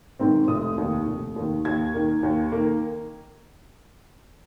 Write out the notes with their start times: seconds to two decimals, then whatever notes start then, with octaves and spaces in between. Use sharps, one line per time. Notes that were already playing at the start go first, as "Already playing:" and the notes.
0.19 G#2 D#3 C4
0.48 F1 D#6
0.78 D#2 D#3
1.06 F1
1.36 D#2 D#3
1.65 D#2 G#6
1.94 D#3 A#3
2.23 D#2
2.52 D#3 A#3